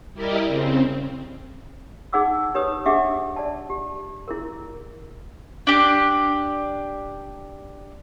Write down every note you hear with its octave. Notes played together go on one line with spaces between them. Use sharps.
G3 E4 G4 A#4 D5 D#5
C#3 C4
D#4 G#4 F#5 D6 E6
D#4 G4 B4 C#5 D#6
D4 G4 G#4 E5 F#5 D6
D5 A5
G4
E4 G#4 A#4
D4 G4